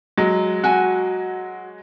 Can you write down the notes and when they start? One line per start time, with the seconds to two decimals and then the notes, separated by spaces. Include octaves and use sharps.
0.18 F#3 G#3
0.64 F#4 G#5